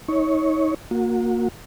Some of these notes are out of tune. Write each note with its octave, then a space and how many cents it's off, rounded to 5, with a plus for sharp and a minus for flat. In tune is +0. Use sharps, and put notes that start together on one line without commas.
D#4 +35 C#5 +0
A#3 -10 F#4 -35